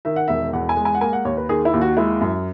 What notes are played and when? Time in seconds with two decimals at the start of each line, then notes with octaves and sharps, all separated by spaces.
0.05 D#3 E5
0.16 F#5
0.28 E1 E5
0.53 E2 F#5
0.69 G#5
0.77 G#3
0.85 G#5
0.95 F#5
1.01 A#3 G#5
1.13 F#5
1.25 D#2 C#5
1.37 B4
1.49 D#3 G#4
1.65 E4
1.73 D#2
1.81 F#4
1.97 G#3 E4
2.21 F#2